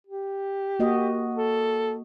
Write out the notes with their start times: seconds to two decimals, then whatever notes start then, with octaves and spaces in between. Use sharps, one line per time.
0.07 G4
0.79 A#3 F#4 D#5
1.36 A4